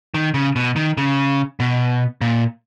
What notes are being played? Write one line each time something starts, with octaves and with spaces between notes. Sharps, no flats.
D#3
C#3
B2
D#3
C#3
B2
A#2